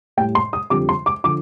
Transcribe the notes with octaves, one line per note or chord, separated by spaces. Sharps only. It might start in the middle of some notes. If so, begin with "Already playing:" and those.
A2 G3 G5
C6
D#6
F2 D3 G3 D6
C6
D6
D3 F3 D6